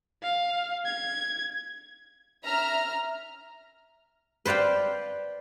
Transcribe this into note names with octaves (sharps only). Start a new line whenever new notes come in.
F5
G#6
E5 A#5 F6
B4 C5 D5 F5 G5